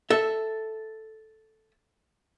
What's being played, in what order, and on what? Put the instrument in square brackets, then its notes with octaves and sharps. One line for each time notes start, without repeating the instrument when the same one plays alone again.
[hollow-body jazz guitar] A4 E5